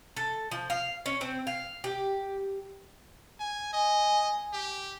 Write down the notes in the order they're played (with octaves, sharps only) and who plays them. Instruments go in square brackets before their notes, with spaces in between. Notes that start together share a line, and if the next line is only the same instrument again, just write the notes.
[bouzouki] A4
F3
F5
C#4
C4
F5
G4
[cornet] G#5
[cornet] D#5 [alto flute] G#5
[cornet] G4